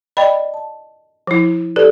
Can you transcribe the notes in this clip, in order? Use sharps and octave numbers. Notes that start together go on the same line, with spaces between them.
D5 D#5 G5 B5
A5
F3 E4
G4 A4 B4 D5